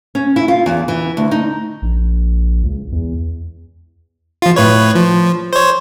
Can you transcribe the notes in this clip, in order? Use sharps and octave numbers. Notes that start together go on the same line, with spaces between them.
C#4
E4
F4
E2
E3
D2
D#4
A#1
C#2
E2
F3 F4
A2 B4 C#5
F3
C5 C#5